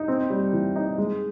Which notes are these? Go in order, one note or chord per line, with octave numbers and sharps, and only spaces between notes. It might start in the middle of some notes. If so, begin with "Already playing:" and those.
Already playing: D#4
C4
G3
E3
D#4
G#3